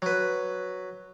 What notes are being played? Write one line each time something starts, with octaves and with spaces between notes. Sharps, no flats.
F#3 B4